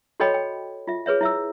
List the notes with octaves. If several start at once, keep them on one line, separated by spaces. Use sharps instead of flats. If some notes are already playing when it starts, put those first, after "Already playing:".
F#4 A4 C#5 D#5 G5 B5
G5
F4 E5
G#4 B4 C#5 E5
E4 E5 E6